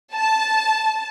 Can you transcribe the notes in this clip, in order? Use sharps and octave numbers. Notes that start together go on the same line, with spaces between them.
A5